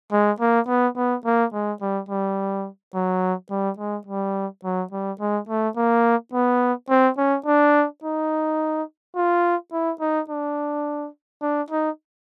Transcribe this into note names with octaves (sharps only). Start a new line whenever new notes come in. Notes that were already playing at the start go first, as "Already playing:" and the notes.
G#3
A#3
B3
B3
A#3
G#3
G3
G3
F#3
G3
G#3
G3
F#3
G3
G#3
A3
A#3
B3
C4
C#4
D4
D#4
F4
E4
D#4
D4
D4
D#4